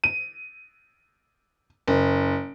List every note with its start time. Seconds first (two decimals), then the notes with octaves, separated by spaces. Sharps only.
0.04 D#7
1.87 F#1